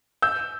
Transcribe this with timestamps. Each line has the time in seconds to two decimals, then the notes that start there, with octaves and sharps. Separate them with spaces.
0.22 E6 G6